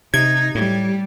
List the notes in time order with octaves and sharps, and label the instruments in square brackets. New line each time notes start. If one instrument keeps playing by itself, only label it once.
[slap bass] C3 [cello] D#4 [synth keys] G#6
[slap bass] A2 [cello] G3